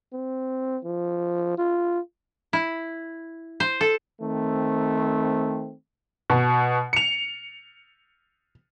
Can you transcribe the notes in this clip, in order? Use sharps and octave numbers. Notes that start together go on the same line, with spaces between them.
C4
F3
F4
E4
C5
A4
D#3 A3 C4
B2
C#7 F7